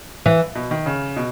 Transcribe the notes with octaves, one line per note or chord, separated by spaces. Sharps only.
E3
B2
D#3
C#3
B2